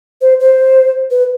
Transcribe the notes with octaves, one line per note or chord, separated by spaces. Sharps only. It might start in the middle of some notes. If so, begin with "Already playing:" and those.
C5
C5
B4